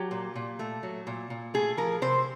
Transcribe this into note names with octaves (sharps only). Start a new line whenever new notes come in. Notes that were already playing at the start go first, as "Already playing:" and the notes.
Already playing: F#3 G4
A#2
A#2
A3
F#3
A#2
A#2
A3 G#4
F3 A#4
C3 C5